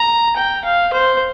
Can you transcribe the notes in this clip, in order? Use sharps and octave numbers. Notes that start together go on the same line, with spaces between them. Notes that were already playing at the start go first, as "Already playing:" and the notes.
Already playing: A#5
G5
F5
C5